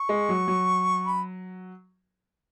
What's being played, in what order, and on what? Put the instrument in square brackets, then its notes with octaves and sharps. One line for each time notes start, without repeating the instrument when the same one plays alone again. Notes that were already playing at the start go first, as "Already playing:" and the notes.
Already playing: [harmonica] C#6
[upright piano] G#3
F#3
F#3
[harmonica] B5